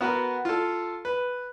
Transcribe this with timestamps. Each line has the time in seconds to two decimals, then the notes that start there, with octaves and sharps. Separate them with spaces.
0.01 B3 F#4 A#4 B4
0.45 F4 A4
1.05 B4